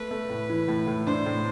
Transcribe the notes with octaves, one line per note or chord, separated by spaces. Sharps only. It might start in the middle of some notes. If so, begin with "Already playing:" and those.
Already playing: A3 B4
A3
A2
E3
A2
A2
D4 C5
A2